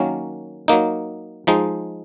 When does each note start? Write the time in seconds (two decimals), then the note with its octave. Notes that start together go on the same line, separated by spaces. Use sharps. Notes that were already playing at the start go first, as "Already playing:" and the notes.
Already playing: D#3 F#3 A#3 C#4
0.68 F#3 A#3 D#4
1.47 F3 G#3 D#4